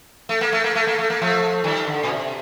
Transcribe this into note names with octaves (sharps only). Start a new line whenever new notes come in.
A3
A#3
A3
A#3
A3
A#3
A3
A#3
F3 A3
D#3 G3
D3
A#2
C3